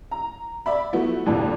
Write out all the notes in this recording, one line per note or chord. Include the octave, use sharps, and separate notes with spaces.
A#5
D5 E5 B5
F3 F#3 A3 B3 E4 F#4
C2 F2 A#2 D3